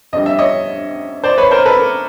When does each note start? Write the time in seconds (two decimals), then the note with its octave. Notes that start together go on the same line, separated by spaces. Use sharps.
0.13 F2 D3 G3 D#5
0.26 E5
0.39 C#5 D#5
1.24 C5 D5
1.38 B4 C#5
1.51 A#4 C5
1.65 A4 B4
1.79 A#4